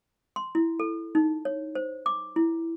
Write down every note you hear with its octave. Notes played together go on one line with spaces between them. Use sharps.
C6
E4
A4
D#4
C#5
C5
D6
E4